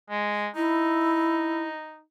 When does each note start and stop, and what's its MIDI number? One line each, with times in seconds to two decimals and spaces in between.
0.10 0.48 56
0.56 2.01 63
0.56 1.64 64